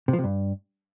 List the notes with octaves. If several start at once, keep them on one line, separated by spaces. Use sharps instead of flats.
C3
F3
C3
G2